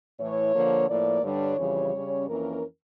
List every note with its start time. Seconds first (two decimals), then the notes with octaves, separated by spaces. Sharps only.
0.19 A2 E3 A3 C#5
0.54 D3 F3 A#3
0.88 A2 F3 A#3 D5
1.23 G2 D3 G3 D4 C#5
1.58 F2 C#3 E3 G3
1.93 C#3 G3 C#4
2.27 F2 E3 A#3 C#4 A#4